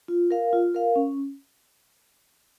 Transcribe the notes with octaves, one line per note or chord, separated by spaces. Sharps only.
F4
A#4 F5
F4
A#4 F5
C#4